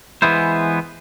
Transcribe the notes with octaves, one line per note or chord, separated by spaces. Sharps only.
E3 G#3 B3 E4 C5